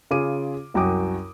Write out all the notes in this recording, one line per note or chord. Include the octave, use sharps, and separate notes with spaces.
C#3 F4 G#4 D6 D#7
C2 F#2 F#4 G5 D6 D#6